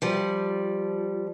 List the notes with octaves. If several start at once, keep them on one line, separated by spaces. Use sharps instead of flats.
F3 G3